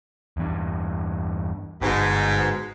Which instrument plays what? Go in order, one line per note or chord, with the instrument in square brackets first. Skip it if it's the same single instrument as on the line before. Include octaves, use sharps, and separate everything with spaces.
[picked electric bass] E2 G2
[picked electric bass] G1 [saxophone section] G#2 B2